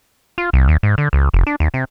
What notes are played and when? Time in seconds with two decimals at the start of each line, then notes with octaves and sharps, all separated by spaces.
0.38 F4
0.53 C2
0.68 D#2
0.83 G#2
0.98 D3
1.13 C#2
1.34 F1
1.47 D4
1.60 D#2
1.74 C3